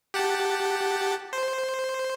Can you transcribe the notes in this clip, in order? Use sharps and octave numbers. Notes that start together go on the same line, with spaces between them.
G4 F#5 A5
C5